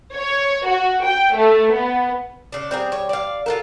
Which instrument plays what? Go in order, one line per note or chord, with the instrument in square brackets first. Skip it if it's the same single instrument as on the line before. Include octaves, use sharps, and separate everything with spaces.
[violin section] C#5
F#4
G5
A3
B3
[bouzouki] C#3 D4
[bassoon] G3 [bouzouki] C4 G#4 A#4
[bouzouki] C#5
D5 F5
[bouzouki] F4 F#4 A4 [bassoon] A#4